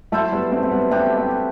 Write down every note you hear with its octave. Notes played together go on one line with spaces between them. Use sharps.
F#3 A3 E4 A4 C5 E5
G3 B3
A3 C4
A3
G3 B3
A3 B3 C4 D4 G4
A3 C4